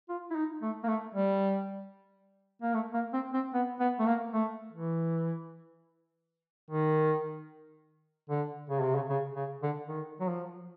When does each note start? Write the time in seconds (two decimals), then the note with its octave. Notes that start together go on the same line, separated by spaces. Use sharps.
0.09 F4
0.31 E4
0.35 D#4
0.62 A3
0.84 A#3
0.88 A3
1.15 G3
2.62 A#3
2.74 A3
2.94 A#3
3.13 C4
3.33 C4
3.54 B3
3.80 B3
3.99 A3
4.06 A#3
4.33 A3
4.73 E3
6.71 D#3
8.30 D3
8.70 C#3
8.82 C3
8.95 C#3
9.09 C#3
9.36 C#3
9.62 D3
9.88 D#3
10.20 F#3
10.29 F3